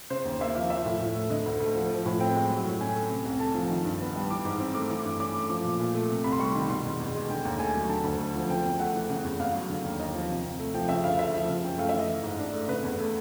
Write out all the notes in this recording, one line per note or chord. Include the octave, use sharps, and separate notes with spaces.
C#3 C5
D#2
A#3 E5
F3 F5
F3 E5
A2
A2
A3
D3 D#5
D2
A3
F3
F3
A2
C4 G5
G#3
F#3
A2
C#4 G#5
A3
C3
C2
A3 A5
F3
D#3
G2
B3
G3
E3 D6
G#2
C4
A3 D6
E3 D6
G2
C#4 D6
A3
F3 D6
A#2
A#2
A3
C3
C2 B5
C6
G3 C#6
D#3
B2 C6
E2
E2
G#3
D3 G5
D#2
A3 G#5
F#3
D3 A5
D2
A3
F3
C#3 G5
E2
A3 F#5
E3
C#3
E2
E2 F5
F#3
D3
D#2
D#2 D#5
F3
C3
C2
A3
F3 G5
C#3 E5
D2 F5
A3 E5
F3
C#3
F#2 G5
A3 F5
E5
E3 D#5
E3
G#2
D4
A3
C#3 B4
E2
A3